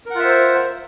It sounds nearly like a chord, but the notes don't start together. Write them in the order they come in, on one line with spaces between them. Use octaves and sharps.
A#4 F#5 F4 E5 C5